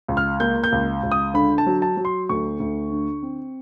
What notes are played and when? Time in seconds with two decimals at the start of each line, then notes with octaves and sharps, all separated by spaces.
0.08 C#2
0.17 F6
0.40 A#3 G6
0.64 G6
0.72 C#2
1.03 C#2
1.12 D#6
1.34 D3 B5
1.58 A5
1.67 F#3
1.82 A5
1.97 F#3
2.05 C6
2.29 D2 C#6
2.60 D2
2.91 D3
3.23 C4